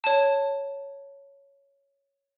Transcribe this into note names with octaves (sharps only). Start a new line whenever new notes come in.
C#5 A5